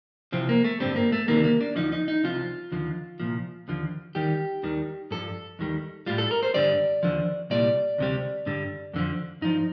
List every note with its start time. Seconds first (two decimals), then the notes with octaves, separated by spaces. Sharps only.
0.32 C2 C3 F3 C4
0.49 A#3
0.64 A3
0.80 G2 D3 G3 C4
0.96 A#3
1.12 A3
1.28 D2 C3 D#3 G3 A#3
1.44 A#3
1.61 D4
1.76 D2 D3 F3 D#4
1.92 D#4
2.08 D#4
2.24 C2 C3 F3 F4
2.72 D#2 D3 F3
3.20 C2 A#2 F3
3.68 D#2 D3 F3
4.15 D#2 D#3 G3 G4
4.63 D#2 D#3 G3
5.11 G2 F3 A4
5.59 D#2 D#3 G3
6.06 A2 G3 F4
6.18 A4
6.31 A#4
6.43 C5
6.54 G2 D3 G3 D5
7.03 D#2 D3 F3
7.50 C2 A#2 G3 D5
7.98 D2 C3 G3
8.46 G2 D3 G3
8.94 F2 D3 F3
9.41 G2 F3 D#4